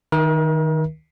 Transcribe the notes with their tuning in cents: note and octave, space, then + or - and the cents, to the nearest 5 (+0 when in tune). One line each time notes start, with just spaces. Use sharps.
D#3 +0 A#4 +40 E5 +0